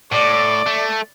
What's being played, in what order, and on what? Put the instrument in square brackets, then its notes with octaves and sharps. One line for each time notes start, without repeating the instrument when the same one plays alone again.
[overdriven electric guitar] A2 [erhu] D5
[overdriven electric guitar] A3